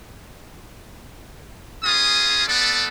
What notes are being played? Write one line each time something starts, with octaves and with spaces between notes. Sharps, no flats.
C#4 F4 G#4 D#6
A3 B3 A4 D5